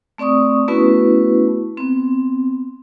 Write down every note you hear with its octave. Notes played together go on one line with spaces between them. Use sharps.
A3 C4 D5 C#6 D#6
A3 B3 C#4 E4 F#4 B4
B3 C4